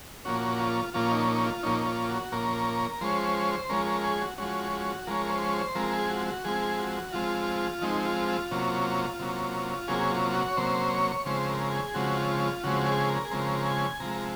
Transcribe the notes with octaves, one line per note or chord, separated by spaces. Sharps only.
A#2 F3 A#3 C#4 F#4
F4
A#2 F3 A#3 C#4 F4
D#4
D#4
F4
A#2 F3 A#3 C#4 D#4
F4
F#4
A#2 F3 A#3 C#4 A#4
F3 G#3 C#4 C5
F3 G#3 C#4 A#4
A#4
G#4
F#4
F3 G#3 C#4 F#4
F#4
F3 G#3 C#4 A#4
C5
C5
F3 G#3 C4 A#4
G#4
F#4
F#4
F3 G#3 C4 G#4
F#4
F3 G#3 C4 F4
F3 G#3 C4 D#4
F4
F4
C3 F#3 A#3 C#4
C3 F#3 A#3 C#4
C3 F#3 A#3 C#4 G#4
F4
F#4
C#5
C3 F#3 A#3 C#4 C5
C#5
C#3 F3 G#3 C4 C5
A#4
G#4
C#3 F3 G#3 C4 F#4
F4
F4
C#3 F3 G#3 C4 F#4
G#4
A#4
G#4
C#3 F3 G#3 C4 A#4
G#5
C3 F3 G#3 A#5